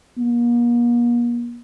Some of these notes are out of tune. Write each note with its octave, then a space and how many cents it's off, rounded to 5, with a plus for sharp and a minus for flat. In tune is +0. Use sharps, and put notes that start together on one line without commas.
A#3 +40